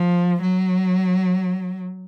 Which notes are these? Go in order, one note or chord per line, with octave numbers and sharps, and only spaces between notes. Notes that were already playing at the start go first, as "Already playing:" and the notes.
Already playing: F3
F#3